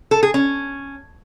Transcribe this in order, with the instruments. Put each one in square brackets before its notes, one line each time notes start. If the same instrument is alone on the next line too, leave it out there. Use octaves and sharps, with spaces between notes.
[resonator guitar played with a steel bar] A4
G#4
C#4